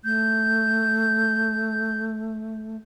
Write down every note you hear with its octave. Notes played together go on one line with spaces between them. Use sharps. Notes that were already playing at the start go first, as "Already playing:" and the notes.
A3 G6